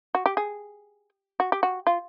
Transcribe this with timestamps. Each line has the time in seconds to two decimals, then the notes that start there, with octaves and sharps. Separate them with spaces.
0.15 F#4
0.26 G4
0.37 G#4
1.40 F#4
1.52 G4
1.63 F#4
1.87 F4